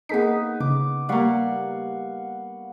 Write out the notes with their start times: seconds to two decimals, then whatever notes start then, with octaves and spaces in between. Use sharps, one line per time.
0.09 A#3 B3 D#4 G#4 B6
0.60 C#3 D6
1.09 G3 A#3 F5 F#5 C#6